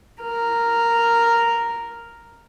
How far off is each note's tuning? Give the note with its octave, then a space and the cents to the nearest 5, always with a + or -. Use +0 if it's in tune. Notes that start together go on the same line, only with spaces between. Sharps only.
A#4 -5